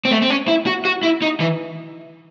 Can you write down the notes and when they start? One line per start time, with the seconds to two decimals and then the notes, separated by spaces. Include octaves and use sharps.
0.05 C4
0.11 A3
0.22 C4
0.30 C#4
0.48 E4
0.66 F#4
0.85 F#4
1.03 E4
1.22 D#4
1.40 E3